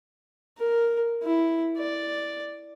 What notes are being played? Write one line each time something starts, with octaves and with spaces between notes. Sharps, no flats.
A#4
E4
D5